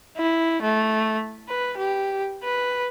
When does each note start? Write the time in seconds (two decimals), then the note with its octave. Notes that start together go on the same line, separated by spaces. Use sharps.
0.17 E4
0.62 A3
1.49 B4
1.77 G4
2.44 B4